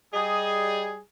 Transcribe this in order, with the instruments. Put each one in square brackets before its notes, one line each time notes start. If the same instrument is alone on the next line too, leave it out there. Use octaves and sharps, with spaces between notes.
[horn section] G3 G#4 [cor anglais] D#5